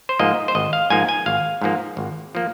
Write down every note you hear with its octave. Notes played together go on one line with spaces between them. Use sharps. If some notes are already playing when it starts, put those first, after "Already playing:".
C5
G#2 F3 A#3 D#5
C5
G#1 D#5
F5
G#2 F3 A#3 G#5
G#5
G#1 F5
G#2 F3 A#3
G#1
F3 A#3